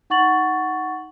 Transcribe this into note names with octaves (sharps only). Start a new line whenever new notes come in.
D#4 F#5 C#6 A6 F#7